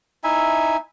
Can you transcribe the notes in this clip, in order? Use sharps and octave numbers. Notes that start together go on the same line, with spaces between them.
D#4 E4 E5 G#5